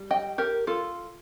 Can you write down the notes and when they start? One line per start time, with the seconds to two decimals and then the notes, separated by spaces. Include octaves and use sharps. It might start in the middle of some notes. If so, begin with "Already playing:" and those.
Already playing: G3
0.11 D#5 G5
0.38 G4 A#4
0.67 F4 A4